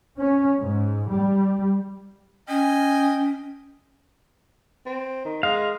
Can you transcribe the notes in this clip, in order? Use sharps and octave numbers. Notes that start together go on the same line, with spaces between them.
C#4
G#2
G3
C#4 D#5 G5 G#5
C4
D#3
G#3 F5